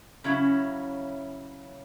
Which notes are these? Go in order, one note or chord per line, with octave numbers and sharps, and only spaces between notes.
C#3 F#3 C#4 E4